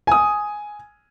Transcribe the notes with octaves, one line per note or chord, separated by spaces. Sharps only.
G#5 D#6